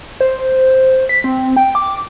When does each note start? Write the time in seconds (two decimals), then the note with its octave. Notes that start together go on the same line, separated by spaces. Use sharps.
0.20 C5
1.09 B6
1.24 C4
1.57 G5
1.75 D6